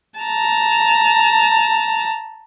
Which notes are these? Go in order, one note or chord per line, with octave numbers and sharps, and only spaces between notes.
A5 A#5